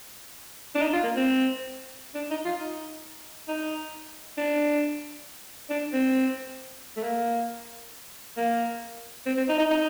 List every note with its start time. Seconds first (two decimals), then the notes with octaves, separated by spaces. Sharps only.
0.75 D4
0.82 D#4
0.93 F4
1.04 A#3
1.16 C4
2.15 D4
2.31 D#4
2.45 F4
2.60 D#4
3.48 D#4
4.38 D4
5.70 D4
5.93 C4
6.97 A3
7.03 A#3
8.37 A#3
9.26 C4
9.37 C4
9.49 D#4
9.59 D#4
9.71 D#4